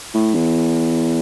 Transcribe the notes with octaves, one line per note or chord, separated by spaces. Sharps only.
A2
E2